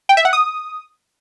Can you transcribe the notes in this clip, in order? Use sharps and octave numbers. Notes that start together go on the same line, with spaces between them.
G5
E5
F#5
D#6